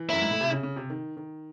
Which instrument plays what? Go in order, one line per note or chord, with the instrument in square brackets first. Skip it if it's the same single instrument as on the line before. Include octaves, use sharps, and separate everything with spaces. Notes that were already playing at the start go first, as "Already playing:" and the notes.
Already playing: [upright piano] E3
[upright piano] F#2 [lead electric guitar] E4
[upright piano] G#2
A2
C3
C#3
C#3
C3
D#3
D#3